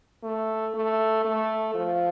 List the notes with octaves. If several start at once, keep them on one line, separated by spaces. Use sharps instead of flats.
A3
A3
A3
F3